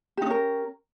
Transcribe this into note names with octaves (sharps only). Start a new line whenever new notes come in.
C#4 D#4 G4 A#4